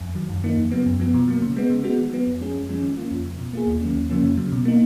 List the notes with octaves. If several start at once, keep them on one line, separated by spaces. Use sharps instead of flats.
F2
D#3 F#3
F#2
D#3 A#3 D#4
F2
C#3 F#3 B3
F#2
F3 B3
B2
F#3 A#3
C#3
G#3 B3
C#3
G#3 B3 F#4
D#3
F#3 B3
F2
F3 G#3 C#4 G#4
F#2
F3 G#3 C#4
D#3
A#3 C#4 F4
F2
C#3 F3
B2
A#3 F4 G#4
D#2
D#3 F#3 A#3 C#4
D#2
C#3 F3 A#3 C#4
F2
C#3 F#3
B2
A#3 D#4